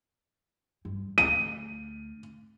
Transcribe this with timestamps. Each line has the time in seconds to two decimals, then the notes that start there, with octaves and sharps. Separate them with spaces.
0.85 G2
1.18 D2 D#7